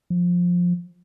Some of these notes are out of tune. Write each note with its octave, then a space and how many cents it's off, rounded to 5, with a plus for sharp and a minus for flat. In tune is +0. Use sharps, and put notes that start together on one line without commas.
F3 +15